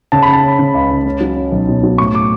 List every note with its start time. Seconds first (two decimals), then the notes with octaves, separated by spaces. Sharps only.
0.12 C#3 A5
0.22 B5
0.28 C#4
0.33 A5
0.43 C#4
0.59 C#3
0.74 C#2
0.90 C#2
1.06 C#4
1.21 F#3
1.36 C#4
1.52 B1
1.68 B2
1.83 F#3
1.98 A2 C#6
2.15 D6